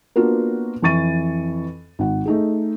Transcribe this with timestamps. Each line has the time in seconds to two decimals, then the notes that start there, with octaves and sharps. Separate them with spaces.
0.16 A#3 B3 D4 F4 F#4 A#4
0.82 F2 E3 C#6 A6 D#7
1.99 G#1 F#5
2.25 A3 D#4 G#4